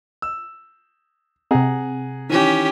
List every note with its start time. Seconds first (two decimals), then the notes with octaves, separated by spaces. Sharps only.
0.22 E6
1.51 C3 C4 G#4 F#5 A#5
2.30 D#3 E3 C#4 G4